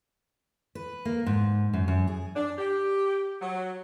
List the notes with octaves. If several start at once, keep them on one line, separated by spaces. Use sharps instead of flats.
B4
A#3
G#2
F#2
F#2
G#4
D4
G4
F#3